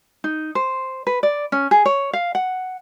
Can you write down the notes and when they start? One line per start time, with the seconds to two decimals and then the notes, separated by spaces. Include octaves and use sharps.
0.24 D#4
0.55 C5
1.07 B4
1.23 D5
1.52 C#4
1.71 G#4
1.86 C#5
2.13 F5
2.35 F#5